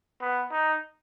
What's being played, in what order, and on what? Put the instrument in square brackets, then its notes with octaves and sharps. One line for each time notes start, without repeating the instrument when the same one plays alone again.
[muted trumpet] B3
D#4